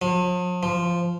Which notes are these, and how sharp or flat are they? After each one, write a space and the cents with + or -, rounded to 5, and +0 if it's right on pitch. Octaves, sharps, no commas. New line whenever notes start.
F3 +45
F3 -10